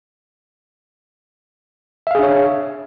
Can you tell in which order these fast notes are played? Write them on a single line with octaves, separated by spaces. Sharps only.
E5 F5 G#4 D4 C#5